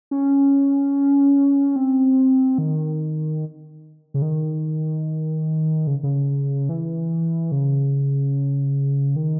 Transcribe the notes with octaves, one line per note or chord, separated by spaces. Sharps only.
C#4
C4
D#3
C#3
D#3
C#3
C#3
E3
C#3
D#3